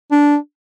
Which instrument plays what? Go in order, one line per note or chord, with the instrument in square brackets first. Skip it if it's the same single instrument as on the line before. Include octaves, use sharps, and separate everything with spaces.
[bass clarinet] D4